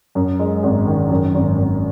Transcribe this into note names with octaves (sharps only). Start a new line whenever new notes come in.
F#2
G#3
G#1
D#3
F#2
G#1
G#1